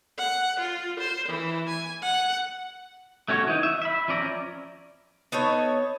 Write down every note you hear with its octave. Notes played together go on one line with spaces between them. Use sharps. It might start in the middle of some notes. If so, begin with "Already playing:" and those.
F#5
F4
C5
E3
G#5
F#5
A3 C#4 F#4 C#5
E3 D#4
E5
E5 B5
F3 C#4 D5 A#5
B3 D#4 A4 C#5